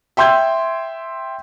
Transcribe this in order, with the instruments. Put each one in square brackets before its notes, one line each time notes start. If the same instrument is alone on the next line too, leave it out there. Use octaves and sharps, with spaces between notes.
[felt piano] E5 G5 C6 E6 G6 G#6